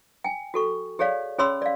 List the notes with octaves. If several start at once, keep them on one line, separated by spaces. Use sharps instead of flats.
G5 G#5
F#4 A4 C#6
G4 G#4 C#5 D5 F5
C#4 G#4 C#5 B5 C6 E6
D5 F5